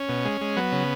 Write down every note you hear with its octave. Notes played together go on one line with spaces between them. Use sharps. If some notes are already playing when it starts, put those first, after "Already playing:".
Already playing: C#4
B2
G#3
G#3
F#3 B3
C#3